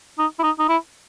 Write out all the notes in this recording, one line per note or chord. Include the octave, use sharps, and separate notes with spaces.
D#4
E4
D#4
D#4
E4